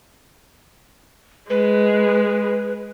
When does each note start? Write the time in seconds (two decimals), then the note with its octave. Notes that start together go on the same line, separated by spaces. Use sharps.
1.50 G#3 B4